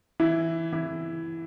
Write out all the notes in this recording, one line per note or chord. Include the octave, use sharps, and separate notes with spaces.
E3 E4
E3 E4